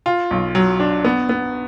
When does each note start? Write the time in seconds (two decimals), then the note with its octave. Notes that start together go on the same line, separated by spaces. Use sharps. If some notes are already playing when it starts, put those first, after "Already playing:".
0.06 F4
0.31 B1
0.55 F#3
0.80 D4
1.05 B3
1.29 B3